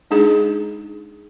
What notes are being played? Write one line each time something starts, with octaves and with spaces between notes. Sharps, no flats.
G#3 D4 D#4 G#4